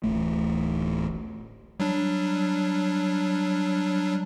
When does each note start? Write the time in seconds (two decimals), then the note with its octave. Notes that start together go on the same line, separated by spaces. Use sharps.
0.04 D1 A1 A3
1.80 F#3 G3 D4